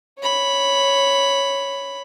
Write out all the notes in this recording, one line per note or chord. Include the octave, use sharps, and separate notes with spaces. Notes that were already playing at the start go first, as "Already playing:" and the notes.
C#5 B5